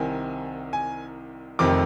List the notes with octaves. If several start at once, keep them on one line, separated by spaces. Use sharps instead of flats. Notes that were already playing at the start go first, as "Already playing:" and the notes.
Already playing: C2 C3 D#3 G#5
G#5
F1 F2 C3 D#3 D6